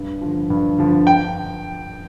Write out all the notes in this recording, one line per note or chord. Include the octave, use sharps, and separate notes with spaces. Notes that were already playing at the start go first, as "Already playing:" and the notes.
Already playing: G2
D3 F3
G2
D3 F3
G5